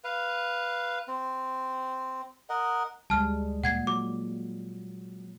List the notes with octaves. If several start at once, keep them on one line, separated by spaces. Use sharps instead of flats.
B4 F5
C4
A#4 D#5 F#5
D2 G3 G#3 A5 F6
A#2 F#5 G#6 C7
F#3 D6